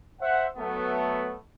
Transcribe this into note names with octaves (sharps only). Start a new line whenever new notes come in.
C5 E5 F#5
F#3 A3 B3